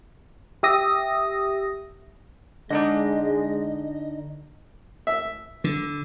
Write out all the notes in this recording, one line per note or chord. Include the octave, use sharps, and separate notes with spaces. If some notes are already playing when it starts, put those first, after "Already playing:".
G4 E5 D#6 A#6
D3 G#3 D4 D#4 D#5
E5
D3